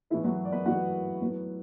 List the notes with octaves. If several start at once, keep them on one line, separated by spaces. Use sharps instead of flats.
A2 E3 B3 E4
F#3 F#4
D5
B3 B4
A2 E3 B3 F#4 F#5
A2 F#3 B3